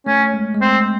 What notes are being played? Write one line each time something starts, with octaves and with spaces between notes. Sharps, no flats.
A3 C#4
G#3
G#3
A3 C4